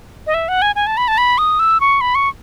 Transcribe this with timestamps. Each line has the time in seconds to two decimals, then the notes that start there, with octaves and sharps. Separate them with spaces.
0.27 D#5
0.34 E5
0.48 F#5
0.62 G#5
0.76 G#5
0.87 A5
0.97 B5
1.08 A5
1.18 B5
1.38 D#6
1.59 E6
1.80 C#6
2.01 B5
2.15 C#6